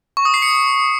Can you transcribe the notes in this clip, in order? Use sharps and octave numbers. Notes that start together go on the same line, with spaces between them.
C#6
D#6
C7
C#7